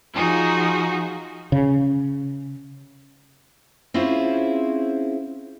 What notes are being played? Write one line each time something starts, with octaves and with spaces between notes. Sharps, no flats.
F3 D#4 F4 F#4 G#4
C#3
C4 C#4 E4 F4 G#4 C5